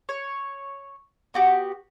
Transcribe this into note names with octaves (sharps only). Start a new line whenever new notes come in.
C#5
B3 F#4 G4